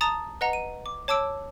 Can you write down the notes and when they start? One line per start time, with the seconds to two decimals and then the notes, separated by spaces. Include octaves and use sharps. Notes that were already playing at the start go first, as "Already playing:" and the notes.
0.01 A5 A#5 D#6 A6
0.41 B4 D#5 F#5 A#5
0.53 D#7
0.86 D6
1.08 C#5 A5 D6 E6 D7